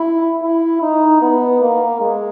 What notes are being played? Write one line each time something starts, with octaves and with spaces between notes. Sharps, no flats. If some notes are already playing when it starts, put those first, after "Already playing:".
Already playing: E4
E4
D#4
B3
A#3
G#3